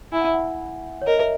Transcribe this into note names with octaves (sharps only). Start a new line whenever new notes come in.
E4 G#5
F#5
E5
F#5
C#5
A#4 D#5
E5